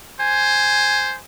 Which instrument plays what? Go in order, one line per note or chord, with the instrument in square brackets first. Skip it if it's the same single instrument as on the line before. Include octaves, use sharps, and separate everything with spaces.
[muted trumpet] C5 [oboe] G#5